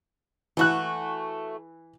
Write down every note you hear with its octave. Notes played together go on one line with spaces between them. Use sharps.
E3 A3 F#4 F#6